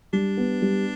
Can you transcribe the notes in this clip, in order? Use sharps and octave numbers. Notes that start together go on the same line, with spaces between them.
G3 D4
B3
G3